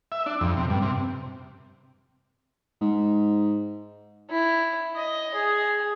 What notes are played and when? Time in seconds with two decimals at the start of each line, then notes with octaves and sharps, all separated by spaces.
0.12 E5
0.26 D4
0.41 F2
0.57 C3
0.70 G2
0.82 C3
2.81 G#2
4.30 E4
4.96 D#5
5.34 G#4